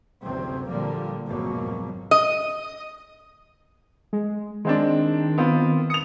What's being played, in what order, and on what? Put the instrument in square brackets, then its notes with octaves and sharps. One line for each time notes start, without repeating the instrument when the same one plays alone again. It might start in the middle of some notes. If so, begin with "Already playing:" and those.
[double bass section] F#1 D2 C3 F#3 C4
A#2 D3 F3 G3 A#3
G#1 F2 B2 F#3 A#3
[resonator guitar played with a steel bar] D#5
[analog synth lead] G#3
[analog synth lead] D#3 [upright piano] G#3 C4 D4
[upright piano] B3 C4 F4
[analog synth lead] D#6 [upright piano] C#7 F7